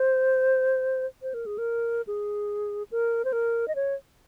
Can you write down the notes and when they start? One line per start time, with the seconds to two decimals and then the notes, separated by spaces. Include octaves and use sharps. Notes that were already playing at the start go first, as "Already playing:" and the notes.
Already playing: C5
1.22 C5
1.34 A#4
1.46 G#4
1.58 A#4
2.07 G#4
2.92 A#4
3.25 C5
3.33 A#4
3.68 D#5
3.75 C#5